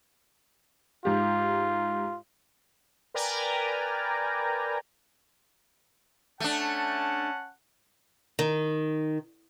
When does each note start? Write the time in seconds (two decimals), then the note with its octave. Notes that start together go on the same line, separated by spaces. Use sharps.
1.05 G#2 F4 G4
3.14 A#4 B4 D5 G5 G#5 A#5
6.40 A3 C#4 D4 F#5 A5
8.39 D#3